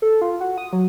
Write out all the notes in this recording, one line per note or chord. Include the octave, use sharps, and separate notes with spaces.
A4
F4
F#4
D#6
F#3